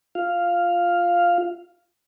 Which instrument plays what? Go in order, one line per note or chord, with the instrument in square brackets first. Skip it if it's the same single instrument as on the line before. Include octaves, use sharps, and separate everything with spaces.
[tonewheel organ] F4 F5